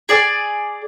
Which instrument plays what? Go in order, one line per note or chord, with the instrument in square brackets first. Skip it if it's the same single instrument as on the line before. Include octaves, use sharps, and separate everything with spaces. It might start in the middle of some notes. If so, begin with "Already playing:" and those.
[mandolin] G#4 D5 G#5